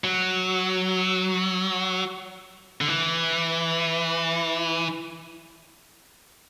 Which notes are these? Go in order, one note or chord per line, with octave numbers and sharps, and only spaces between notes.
F#3
D3
E3